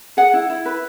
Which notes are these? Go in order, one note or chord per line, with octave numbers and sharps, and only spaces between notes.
G#4 F#5
E4
E4
B4